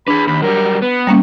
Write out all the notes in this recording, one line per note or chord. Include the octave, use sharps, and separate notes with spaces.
D4 G#4 B4 B5
D#2 B5
F#3 G3 A#4
B3 B4
G3 A#3 C#4